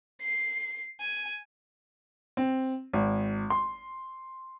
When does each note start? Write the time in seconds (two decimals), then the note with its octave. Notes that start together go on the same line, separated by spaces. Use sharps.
0.22 C7
1.00 G#5
2.37 C4
2.93 G#1
3.50 C6